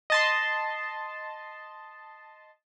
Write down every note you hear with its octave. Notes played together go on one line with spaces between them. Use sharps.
D#5 A5 C6